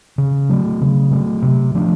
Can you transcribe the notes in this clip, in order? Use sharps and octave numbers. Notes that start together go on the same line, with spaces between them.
C#3
F#3 A3
C#3
F#3 A3
C3
F3 A3 D4